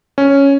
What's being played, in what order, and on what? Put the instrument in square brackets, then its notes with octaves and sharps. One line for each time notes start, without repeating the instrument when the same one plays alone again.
[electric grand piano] C#4